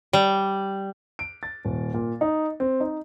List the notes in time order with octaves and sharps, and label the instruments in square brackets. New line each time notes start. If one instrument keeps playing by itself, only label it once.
[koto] G3
[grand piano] D7
A6
D#1
A#2
D#4
C4
D#4